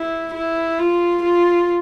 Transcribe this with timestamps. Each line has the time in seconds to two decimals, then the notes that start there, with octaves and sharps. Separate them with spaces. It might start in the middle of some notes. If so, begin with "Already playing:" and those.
Already playing: E4
0.34 E4
0.79 F4
1.23 F4